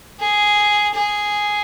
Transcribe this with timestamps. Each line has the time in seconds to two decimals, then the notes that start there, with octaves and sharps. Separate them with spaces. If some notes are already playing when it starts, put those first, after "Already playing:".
0.20 G#4
0.94 G#4